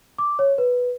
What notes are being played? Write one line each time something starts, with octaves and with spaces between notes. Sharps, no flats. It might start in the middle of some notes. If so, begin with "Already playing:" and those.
D6
C#5
B4